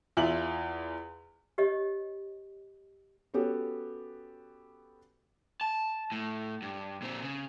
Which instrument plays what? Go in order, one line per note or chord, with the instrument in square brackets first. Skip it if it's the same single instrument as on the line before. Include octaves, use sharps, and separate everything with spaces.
[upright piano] E2 F4 E5 F#7
[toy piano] G4 C#5 D#5
[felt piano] B3 C#4 F#4 G4 A4 C#5
[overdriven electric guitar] A5
A2
G2
A#2 C4
C#3